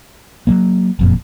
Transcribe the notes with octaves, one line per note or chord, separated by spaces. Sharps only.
F#3 G3 A#3
F#1 F2 A#2